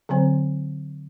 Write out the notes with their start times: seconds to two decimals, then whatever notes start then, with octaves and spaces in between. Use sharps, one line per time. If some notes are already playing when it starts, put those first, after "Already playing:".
0.09 D3 F#3 C4 C5